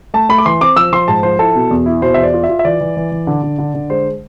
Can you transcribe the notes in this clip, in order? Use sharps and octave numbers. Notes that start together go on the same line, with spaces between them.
A3 A5
A3 B5
D6
E3 C6
C4 D6
F3 E6
F3 C6
G#2 A5
F3 C5
E4 A4
B2
E2
E4
B2 C5
E5
E2
D5
F4
E5
F4
E5
E3 D5
E3
E3
E3
D3
D3
D3
D3
G#3 C5